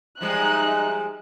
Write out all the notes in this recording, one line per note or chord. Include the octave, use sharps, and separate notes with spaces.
F3 G3 G#3 D#4 E5 F#6